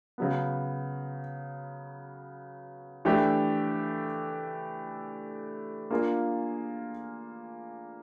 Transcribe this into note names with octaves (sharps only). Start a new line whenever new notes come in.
C#3 F#3 B3
E3 A3 D4 G4
A#3 D4 F4 G#4